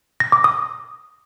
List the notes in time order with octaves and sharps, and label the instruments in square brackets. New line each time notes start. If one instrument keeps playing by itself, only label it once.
[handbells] A#6
D6
D#6